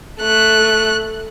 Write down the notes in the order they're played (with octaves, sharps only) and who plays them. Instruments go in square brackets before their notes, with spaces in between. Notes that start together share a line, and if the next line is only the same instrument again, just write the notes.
[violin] A3 F#6